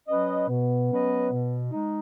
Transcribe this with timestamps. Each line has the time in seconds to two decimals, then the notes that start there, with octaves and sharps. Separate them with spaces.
0.08 F#3 C#4 B4 D#5
0.48 B2 B3
0.90 F#3 C#4 B4 D#5
1.31 B2
1.71 G#3 D#4